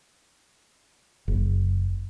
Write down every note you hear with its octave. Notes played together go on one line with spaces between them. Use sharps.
F#1